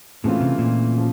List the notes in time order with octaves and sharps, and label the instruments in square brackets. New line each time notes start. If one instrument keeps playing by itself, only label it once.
[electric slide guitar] A2 [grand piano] C#3 E3 A3 C4 F4
[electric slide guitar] C3
A#2
[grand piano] C#3 F3